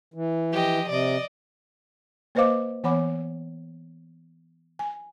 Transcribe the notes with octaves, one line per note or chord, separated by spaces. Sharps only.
E3
F3 G4 D#5
C3 D5 D#5
A#3 B4 C5 D#5 F5 D6
E3 B3 C#5 F#5 B5 D6
G#5